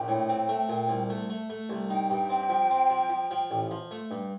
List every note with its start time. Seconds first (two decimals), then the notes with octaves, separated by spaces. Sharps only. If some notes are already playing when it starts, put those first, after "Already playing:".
Already playing: A#1 G5
0.08 A2
0.29 C4
0.49 A3
0.69 A#2
0.89 C2
1.10 A3
1.30 A3
1.50 A3
1.70 C2
1.90 D#4 G5
2.10 G2
2.29 C4
2.49 F3
2.70 C4
2.90 F3
3.10 F3
3.31 F3
3.51 A1
3.71 F3
3.91 A3
4.11 G2